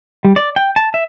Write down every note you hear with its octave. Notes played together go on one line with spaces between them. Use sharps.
G3
D5
G5
A5
E5